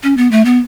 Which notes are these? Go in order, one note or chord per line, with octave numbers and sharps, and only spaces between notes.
C#4
B3
A3
B3